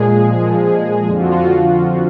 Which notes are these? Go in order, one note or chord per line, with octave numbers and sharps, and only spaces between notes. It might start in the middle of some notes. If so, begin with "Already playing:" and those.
Already playing: A#2 F3 G#3 G#4
A#2 F3
F2 D3 F3 F4
F#4
F4